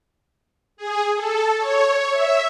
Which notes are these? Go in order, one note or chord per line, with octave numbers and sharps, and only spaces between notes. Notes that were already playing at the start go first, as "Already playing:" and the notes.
G#4
A4
C#5
E5